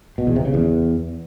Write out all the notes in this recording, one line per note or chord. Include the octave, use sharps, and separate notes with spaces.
B2
E2
C3
C#3
E2